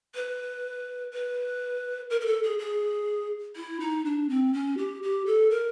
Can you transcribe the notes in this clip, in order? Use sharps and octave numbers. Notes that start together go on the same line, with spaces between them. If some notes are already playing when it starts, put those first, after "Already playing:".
B4
B4
A#4
A#4
A4
G#4
G#4
E4
D#4
D4
C4
C#4
G4
G4
A4
A#4